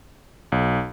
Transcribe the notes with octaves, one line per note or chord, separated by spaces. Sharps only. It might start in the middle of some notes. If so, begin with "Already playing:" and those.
B1